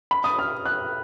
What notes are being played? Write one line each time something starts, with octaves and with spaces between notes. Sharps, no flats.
B5
D#6
F6
F#6